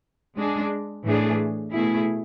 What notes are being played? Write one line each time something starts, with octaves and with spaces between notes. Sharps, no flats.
G#3 D4 G#4
A2 E3 A3 D4 G#4
B2 A3 E4 G#4